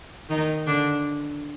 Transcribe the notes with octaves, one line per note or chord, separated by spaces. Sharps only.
D#3 D#4
D3 D4